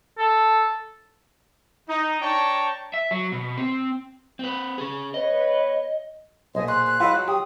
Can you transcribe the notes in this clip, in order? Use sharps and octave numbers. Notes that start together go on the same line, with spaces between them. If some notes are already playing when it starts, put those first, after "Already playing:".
A4
D#4
D4 C#5 G5 A5 A#5 C#6
E5
F#3
B2
C4
C4 B4
C#4 G#4
B3 B4 C#5 D#5
B1 A#2 G#4 C5 D#5
C6 F#6
F#6
E3 F#3 G#3 F4
F#3
G4 D#6